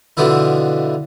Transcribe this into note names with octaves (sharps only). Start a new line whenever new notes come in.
B2 D3 E3 F3 E4